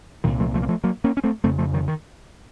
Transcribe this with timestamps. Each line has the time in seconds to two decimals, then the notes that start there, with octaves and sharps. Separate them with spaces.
0.24 C2 A#2 D#3 F#3
0.40 F3 A3
0.54 F3 A3
0.62 A#3
0.68 F3 A3
0.84 F#3 A#3
1.04 A#3 C#4
1.17 C#4
1.24 A3 C4
1.44 F2 C#3 A3 C4
1.58 F3 A3
1.74 D#3 F#3
1.88 D#3